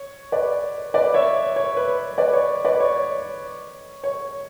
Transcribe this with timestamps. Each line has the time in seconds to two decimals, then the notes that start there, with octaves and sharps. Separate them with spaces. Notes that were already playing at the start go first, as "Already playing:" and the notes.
Already playing: C#5
0.32 B4 D5
0.94 B4 D5
1.14 C#5 E5
1.56 C#5
1.77 B4
2.18 B4 D5
2.33 C#5
2.65 B4 D5
2.80 C#5
4.04 C#5